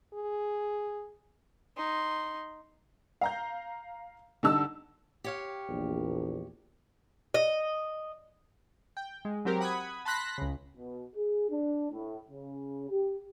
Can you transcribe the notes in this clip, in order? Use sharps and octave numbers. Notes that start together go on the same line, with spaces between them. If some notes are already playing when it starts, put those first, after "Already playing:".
G#4
D#4 C6
F5 A#5 G6
D3 G3 D#4 A5 E6
G4 C#5 F5
A#1 E2
D#5
G5
G#3
F#3 C4 G4 A#4
F#5 B5 D#6 F#6 G#6
A5 B5 C6 F#6 A#6 B6
C#2 C#3
B2
G#4
D4
A2
C#3
G4